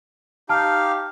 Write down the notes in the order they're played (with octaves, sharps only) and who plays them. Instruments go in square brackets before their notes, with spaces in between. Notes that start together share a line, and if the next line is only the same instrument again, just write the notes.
[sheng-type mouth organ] D#4 G4 F5 [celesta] A5 F6